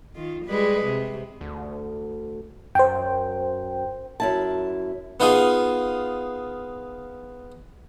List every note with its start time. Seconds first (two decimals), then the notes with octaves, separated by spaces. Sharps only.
0.16 D#3 F4
0.45 G3 G#3 B4
0.85 C3
1.41 D2
2.75 F#2 C5 G5
4.20 F#2 E4 A5
5.20 B3 D#4 F4 G#4